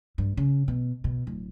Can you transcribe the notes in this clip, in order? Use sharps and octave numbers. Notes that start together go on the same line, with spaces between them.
G2
C#3
B2
B2
D1